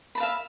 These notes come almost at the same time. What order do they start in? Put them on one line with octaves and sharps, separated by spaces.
B5 A5 F5 E5